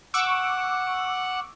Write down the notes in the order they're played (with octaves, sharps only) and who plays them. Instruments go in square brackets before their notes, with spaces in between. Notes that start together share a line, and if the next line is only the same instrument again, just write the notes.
[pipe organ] F#5 [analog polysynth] C#6 D6 E6